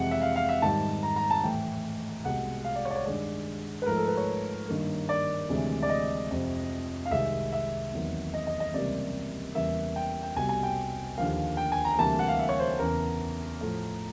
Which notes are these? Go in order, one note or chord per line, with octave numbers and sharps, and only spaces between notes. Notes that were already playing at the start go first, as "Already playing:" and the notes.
Already playing: F2 C3 E3 G#3 F#5
E5
F5
F5
E5
G#2 D#3 G3 A5
A#5
A#5
A5
A2 E3 A3 G5
C2 B2 G#3 F#5
F5
D5
C#5
D5
C#5
G2 D#3 G#3 D5
B4
G#2 F3 A3 A#4
A4
B4
C#5
G2 D#3 G3 A#3
D5
D2 C3 E3 G#3
D5
D#5
F2 C3 F3
F5
C2 C3 D#3 G#3 E5
E5
E2 C3 D#3 F#3 A#3
D#5
D#5
D#5
C#2 C3 E3 G3 A#3 D5
E2 C#3 E3 G3 A#3 E5
G5
G5
C2 B2 G3 G#5
G#5
G5
D#2 D3 F3 A#3 F5
G5
G#5
A#5
D2 C3 E3 G3 A#3 A5
F#5
F5
E5
C#5
C5
E2 C#3 E3 A#4
A2 F3 A3